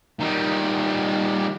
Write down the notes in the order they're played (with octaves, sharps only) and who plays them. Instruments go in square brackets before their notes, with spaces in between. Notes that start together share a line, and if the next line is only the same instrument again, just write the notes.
[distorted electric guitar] D#3 G3